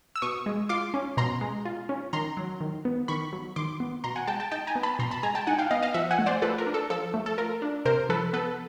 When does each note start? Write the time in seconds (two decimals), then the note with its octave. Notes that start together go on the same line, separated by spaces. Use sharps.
0.16 E6
0.22 B2 C#6 D#6
0.46 G#3
0.69 F4 C6 D6
0.94 C#4
1.17 B2 A#5 C6
1.41 G#3
1.65 F4
1.89 C#4
2.13 D#3 A#5 C6
2.37 F#3
2.61 D#3
2.85 B3
3.08 D#3 B5 C#6
3.33 F#3
3.56 D#3 C6 D6
3.80 B3
4.04 B2 A#5 C6
4.16 F#5 G#5
4.27 G#3 G5 A5
4.40 G5 A5
4.52 D#4 G5 A5
4.67 G#5 A#5
4.75 B3
4.83 A5 B5
4.99 B2 A#5 C6
5.11 A5 B5
5.23 G#3 G#5 A#5
5.35 G5 A5
5.47 D#4 F#5 G#5
5.59 F5 G5
5.71 B3 D#5 F5
5.83 D#5 F5
5.94 F3 E5 F#5
6.11 F#5 G#5
6.19 A3
6.26 C5 D5
6.42 F4 A4 B4
6.58 A#4
6.67 D4
6.74 A4
6.90 F3 A4
7.14 A3
7.26 A4
7.38 F4 A#4
7.62 D4
7.85 C3 A#4 C5
8.09 F3 A4 B4
8.33 B3 A4 B4